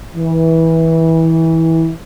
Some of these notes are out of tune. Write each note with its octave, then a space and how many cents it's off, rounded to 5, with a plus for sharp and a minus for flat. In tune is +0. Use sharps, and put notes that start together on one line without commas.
E3 -20